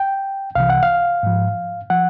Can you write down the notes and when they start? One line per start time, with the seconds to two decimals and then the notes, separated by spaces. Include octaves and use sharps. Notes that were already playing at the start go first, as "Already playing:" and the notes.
Already playing: G5
0.55 C2 C3 E3 F5
0.70 F#5
0.83 F5
1.23 G#2 F3
1.90 F3 F#5